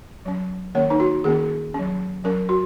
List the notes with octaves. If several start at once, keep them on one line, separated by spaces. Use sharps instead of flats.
F#3 C#4
D#3 A#3 C#4 C#5
D#4
F#4
D#3 A#3 C#4 G#4
F#3 C#4
F#3 C#4 A#4
F#4